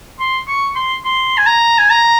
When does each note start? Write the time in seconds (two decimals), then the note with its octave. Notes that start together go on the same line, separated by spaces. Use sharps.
0.19 C6
0.47 C#6
0.76 C6
1.05 C6
1.38 G#5
1.47 A#5
1.79 G#5
1.90 A#5